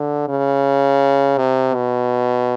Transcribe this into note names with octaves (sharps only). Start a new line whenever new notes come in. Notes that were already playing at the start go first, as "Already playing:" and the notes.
Already playing: D3
C#3
C3
B2